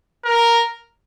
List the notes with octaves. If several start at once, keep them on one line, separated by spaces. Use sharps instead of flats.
A#4